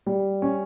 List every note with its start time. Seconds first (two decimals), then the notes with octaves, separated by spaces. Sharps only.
0.06 G3
0.42 C#4